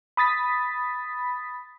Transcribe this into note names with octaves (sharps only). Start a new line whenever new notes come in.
B5 D#6 A6 B6